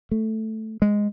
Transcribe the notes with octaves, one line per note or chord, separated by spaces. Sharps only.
A3
G#3